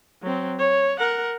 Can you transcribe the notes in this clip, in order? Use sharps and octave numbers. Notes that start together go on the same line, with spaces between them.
F#3 C4
C#5
A#4 F#5